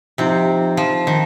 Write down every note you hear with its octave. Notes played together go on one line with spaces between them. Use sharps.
C3 F3 C4 D#4 G4
F3
D#3